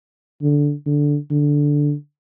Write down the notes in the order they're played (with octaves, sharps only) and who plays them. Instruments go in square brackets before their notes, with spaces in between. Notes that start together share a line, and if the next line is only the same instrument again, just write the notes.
[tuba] D3
D3
D3